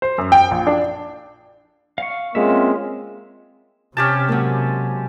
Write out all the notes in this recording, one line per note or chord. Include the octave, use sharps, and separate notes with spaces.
C5
F#2
G5
A#1
D4
F5 C#6
G#3 A#3 C4 C#4 F4 E5
C3 C#4 G4 A5
F#3 G#3 A#3